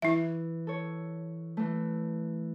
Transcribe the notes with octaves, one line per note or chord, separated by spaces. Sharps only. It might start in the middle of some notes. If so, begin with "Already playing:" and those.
E3 E4 E5
A4 C#5
E3 A3